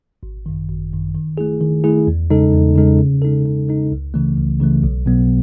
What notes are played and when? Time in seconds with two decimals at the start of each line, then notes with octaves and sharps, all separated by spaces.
0.23 G#1
0.46 F#2 D#3
0.69 G#1
0.92 F#2 D#3
1.15 D#3
1.38 A3 E4 G#4
1.61 D#3
1.84 A3 E4 G#4
2.07 E2
2.30 C#3 G#3 D#4 A4
2.54 E2
2.76 C#3 G#3 D#4 A4
2.99 C#3
3.22 G#3 D#4 A4
3.46 C#3
3.69 G#3 D#4 A4
3.92 C#2
4.14 C#3 E3 A3
4.37 C#2
4.60 C#3 E3 A3
4.83 B1
5.06 B2 F#3 B3